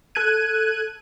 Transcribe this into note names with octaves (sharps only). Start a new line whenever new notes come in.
A4 F#6 G#6 D#7